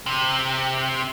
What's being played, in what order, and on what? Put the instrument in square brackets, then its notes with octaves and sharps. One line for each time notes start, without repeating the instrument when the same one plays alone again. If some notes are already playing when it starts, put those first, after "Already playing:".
[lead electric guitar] C3